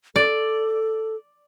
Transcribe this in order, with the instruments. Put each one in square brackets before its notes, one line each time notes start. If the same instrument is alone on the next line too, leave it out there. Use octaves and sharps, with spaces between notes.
[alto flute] A4 [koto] D5